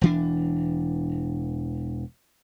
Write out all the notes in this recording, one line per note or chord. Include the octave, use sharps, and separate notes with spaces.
E1 E3 D4